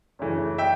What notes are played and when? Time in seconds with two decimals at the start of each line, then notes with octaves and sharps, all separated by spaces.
0.19 F#2 C#3 E3 A3
0.58 E5 G5